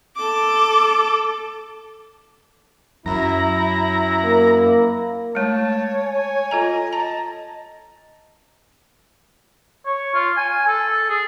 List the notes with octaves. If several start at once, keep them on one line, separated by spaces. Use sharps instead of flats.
A4 D6
F#2 E4 A#5
A#3
G#3 A3 C#5 A5
G#5
F4 A4 D#5 A#5
A5 A#5
C#5
F4
G#5
A4
G#4